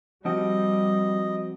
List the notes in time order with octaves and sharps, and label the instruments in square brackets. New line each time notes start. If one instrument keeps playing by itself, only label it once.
[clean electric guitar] F3 C4 F#4 [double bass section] G3 [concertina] D#5